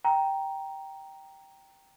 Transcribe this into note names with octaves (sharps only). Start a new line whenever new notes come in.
G5 A#5